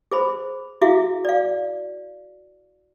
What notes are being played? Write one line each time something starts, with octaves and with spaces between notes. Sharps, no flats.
G#4 C5 B5
E4 F#4 G#4 E5 F5
D5 F5